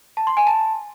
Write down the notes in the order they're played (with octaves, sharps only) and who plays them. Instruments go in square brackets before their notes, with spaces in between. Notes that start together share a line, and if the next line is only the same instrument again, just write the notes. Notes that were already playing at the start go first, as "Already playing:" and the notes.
[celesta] A5
C6
G#5
A5